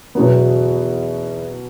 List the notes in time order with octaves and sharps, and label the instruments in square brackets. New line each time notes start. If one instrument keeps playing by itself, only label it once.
[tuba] E2 [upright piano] B2 F#3 B3